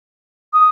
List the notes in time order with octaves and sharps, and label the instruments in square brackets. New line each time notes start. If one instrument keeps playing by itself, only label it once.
[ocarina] D#6